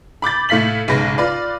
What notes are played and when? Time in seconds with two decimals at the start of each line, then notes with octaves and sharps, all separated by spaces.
0.22 B5 D6 G6 A6
0.49 A2 A3 F5 B6 F#7
0.88 B1 G#2 C#3 B4 A#6
1.18 F4 B4 D5